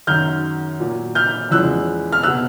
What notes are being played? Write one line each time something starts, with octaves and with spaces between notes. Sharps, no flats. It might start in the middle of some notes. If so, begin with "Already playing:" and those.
F#2 D#3 F#3 F6 G6
A#2 F#3
F6 G6
E2 C#3 F3 G#3 E6 F#6
F6
B2 F#3 E6 F#6